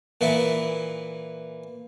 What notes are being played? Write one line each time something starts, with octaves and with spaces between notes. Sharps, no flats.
A#2 E3 E4